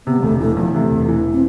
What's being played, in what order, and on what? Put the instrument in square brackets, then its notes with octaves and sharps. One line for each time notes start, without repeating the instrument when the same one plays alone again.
[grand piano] C3 [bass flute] B3
[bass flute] G3
[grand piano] E1 [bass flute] A3
[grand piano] E3 [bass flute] A3
[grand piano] E2 [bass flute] F3
[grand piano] C3 [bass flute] A3
[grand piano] E1
E3
[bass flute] C4